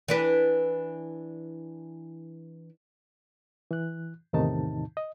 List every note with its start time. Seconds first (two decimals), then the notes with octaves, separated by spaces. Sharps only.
0.08 E3 D4 B4
3.71 E3 F#6
4.33 E2 A2 C3 D#3 D#4 A5
4.97 D#5